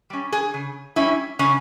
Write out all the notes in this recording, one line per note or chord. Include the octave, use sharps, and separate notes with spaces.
G3 C#4
G#4
C#3
G3 C#4 E4
C#3 C#4